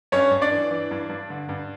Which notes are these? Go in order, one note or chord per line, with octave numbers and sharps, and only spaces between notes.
G2 C#4 C#5
G2
D4 D5
E3
E3
G2
G2
D3
G2